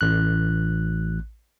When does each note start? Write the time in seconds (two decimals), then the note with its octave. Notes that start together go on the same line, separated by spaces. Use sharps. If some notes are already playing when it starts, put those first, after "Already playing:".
0.01 A1 F#6